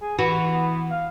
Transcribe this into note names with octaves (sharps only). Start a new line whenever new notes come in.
G#4
E3 F#4 B4
B3
F5